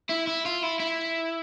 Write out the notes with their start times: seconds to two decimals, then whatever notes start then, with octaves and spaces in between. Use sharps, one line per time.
0.10 E4
0.27 E4
0.45 F4
0.63 E4
0.79 E4